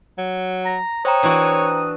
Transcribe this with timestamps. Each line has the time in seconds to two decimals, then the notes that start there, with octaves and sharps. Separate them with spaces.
0.18 F#3
0.65 A#5
1.05 C5 C#5 G5 A#5 D#6
1.23 E3 D4 F#4